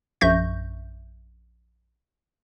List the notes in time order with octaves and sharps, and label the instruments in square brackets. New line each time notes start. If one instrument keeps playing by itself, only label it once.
[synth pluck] A#1 F#2 E5 C#6 G6 A#6